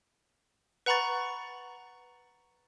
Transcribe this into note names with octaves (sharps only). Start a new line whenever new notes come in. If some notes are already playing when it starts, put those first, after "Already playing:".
B4 F#5 A#5 B5 C#6 A6